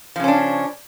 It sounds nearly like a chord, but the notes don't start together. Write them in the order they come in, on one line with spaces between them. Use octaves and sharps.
F3 C#3 C#4 D4